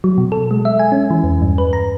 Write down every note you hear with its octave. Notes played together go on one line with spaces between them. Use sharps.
F#3
B2
A4
G#3
E5
G#5
C#4
E3
E2
G2
B4
A#5